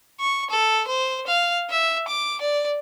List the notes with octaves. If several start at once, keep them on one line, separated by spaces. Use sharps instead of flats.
C#6
A4
C5
F5
E5
D6
D5